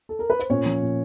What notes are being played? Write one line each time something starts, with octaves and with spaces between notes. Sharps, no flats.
A4
A#4
B4
C5
A#2 C#4 C#5
F3
A#2